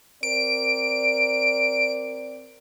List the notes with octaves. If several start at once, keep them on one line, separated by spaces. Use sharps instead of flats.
C4 A#4 D5 D7